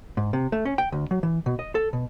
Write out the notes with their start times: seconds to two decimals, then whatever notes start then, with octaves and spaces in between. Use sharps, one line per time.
0.17 G#2
0.33 C3
0.52 A3
0.65 C#4
0.78 G5
0.92 D2
1.11 F#3
1.23 E3
1.46 B2
1.59 D#5
1.75 A4
1.93 B2